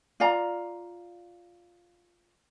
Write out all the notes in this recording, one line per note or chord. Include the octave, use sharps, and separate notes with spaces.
F4 D5 F5 A#5